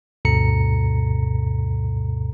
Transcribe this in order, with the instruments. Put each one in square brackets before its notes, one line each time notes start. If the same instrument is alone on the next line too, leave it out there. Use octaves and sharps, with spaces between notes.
[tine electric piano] D2 G2 B2 A4 A#5 C#7